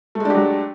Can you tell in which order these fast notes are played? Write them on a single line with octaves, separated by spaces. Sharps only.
A3 G#3 D4 G4 F#3